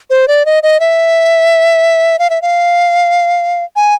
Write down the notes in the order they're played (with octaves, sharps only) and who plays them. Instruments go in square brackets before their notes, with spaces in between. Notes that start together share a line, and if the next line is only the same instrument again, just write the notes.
[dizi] C5
D5
D#5
D#5
E5
F5
E5
F5
G#5